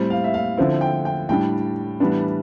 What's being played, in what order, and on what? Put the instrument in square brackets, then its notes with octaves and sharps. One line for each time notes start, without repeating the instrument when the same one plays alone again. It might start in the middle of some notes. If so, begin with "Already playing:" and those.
Already playing: [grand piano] A2 G3 C4
F5
E5
F5
D3 F3 C4 E4
G5
G5
A2 G3 D4 G5
A2 E3 G3 B3 D4